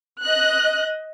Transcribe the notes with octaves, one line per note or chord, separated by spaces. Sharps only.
D#5 F#6